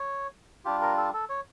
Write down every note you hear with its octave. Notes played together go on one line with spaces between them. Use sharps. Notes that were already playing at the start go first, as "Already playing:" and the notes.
Already playing: C#5
G3 D4 F4 G4
A#4
A4
A4
C#5